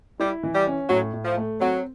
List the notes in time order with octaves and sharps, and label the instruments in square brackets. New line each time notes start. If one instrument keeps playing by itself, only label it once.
[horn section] G3 [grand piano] E4
[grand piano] E3
[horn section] G3
[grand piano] C#4
[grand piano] A2 [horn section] F#3
[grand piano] A2
[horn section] F3
[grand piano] A3
[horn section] F#3 [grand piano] C4